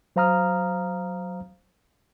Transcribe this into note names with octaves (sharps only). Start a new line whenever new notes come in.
F#3 C5 F5 A#5 D#6 F6